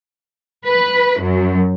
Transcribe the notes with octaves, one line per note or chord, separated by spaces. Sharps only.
B4
F#2